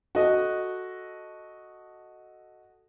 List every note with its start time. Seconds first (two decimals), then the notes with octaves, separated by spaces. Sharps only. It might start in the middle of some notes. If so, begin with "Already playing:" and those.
0.15 F#4 A4 D#5